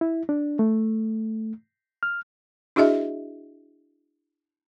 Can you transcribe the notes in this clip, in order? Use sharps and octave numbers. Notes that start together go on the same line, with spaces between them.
E4
D4
A3
F6
D4 E4 F#4 G#4 D#5 E5